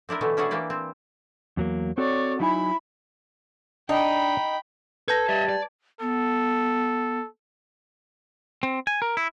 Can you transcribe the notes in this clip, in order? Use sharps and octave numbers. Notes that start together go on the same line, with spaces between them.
C4 D4 E4 A#4
B2 D3 E3 A3
C#4 D4 E4 F#4 G#4
E3 A#3 G4 D5
C4
E2 F#3 A#3
C4 F#4 A4 C#5 D5
F#3 D#4 E4 G#5 B5
D4 D#4 G5 B5
A4 B4 A5 G6 G#6 A#6
G3 D#5 E5
D5
B3 A4
C4
G#5
A#4
E4